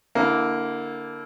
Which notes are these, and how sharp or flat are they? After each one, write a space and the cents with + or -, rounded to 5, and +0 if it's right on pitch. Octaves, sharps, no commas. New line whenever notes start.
D3 -20 A#3 +0 E4 -10